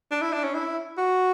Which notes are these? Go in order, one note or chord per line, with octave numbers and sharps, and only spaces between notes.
D4
E4
D4
C#4
E4
F#4